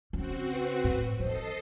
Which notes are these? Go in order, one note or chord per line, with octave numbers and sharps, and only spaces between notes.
C#3 C4 F#4
B4
A2
E3 A4 C5 D#5 C7